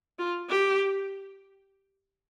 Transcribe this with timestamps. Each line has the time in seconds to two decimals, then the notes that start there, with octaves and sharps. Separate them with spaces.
0.19 F4
0.50 G4